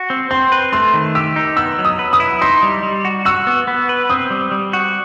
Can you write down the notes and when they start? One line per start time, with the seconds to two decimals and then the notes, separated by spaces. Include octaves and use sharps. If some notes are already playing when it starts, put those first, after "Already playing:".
Already playing: F#4
0.10 C4
0.31 C4 C6
0.52 B4
0.72 A3 C6
0.94 D#3
1.15 G4 E6
1.36 D#4
1.57 B3 E6
1.79 F#3
1.85 D#6
1.99 B4
2.13 D#6
2.20 E4
2.41 D#4 C6
2.63 G3
2.83 G3
3.05 F#4
3.25 F#4 E6
3.47 B3
3.68 B3
3.89 B4
4.10 C4 D#6
4.31 G3
4.52 G3
4.73 F#4